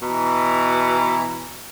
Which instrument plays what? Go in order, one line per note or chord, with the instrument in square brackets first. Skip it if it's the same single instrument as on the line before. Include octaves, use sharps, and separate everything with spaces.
[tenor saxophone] B2 [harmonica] E3 A#5